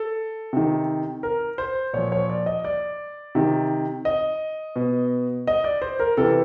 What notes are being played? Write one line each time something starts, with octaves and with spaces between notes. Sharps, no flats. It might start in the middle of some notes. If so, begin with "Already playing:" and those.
Already playing: A4
C3 D#3
A#4
C5
A#2 F3 C#5
C#5
D5
D#5
D5
C3 D#3
D#5
B2
D#5
D5
C5
A#4
C3 E3 A4